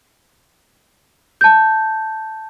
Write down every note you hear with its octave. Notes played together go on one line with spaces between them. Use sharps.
A5 G6